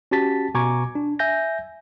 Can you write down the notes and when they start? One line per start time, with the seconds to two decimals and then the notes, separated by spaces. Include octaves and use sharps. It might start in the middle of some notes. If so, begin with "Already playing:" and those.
0.11 C#4 F#4 G4 A5 A6 B6
0.55 B2 G#5 A#5 C#6 D6 G#6
0.95 D4
1.19 E5 G#5 G6 A#6